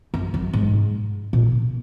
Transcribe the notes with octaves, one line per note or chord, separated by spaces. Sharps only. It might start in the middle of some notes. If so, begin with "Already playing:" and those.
F#2
F#2
G#2
A#2